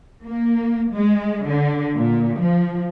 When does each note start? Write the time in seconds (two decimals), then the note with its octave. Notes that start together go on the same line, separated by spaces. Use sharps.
0.25 A#3
0.93 G#3
1.47 D3
1.95 A#2
2.39 F3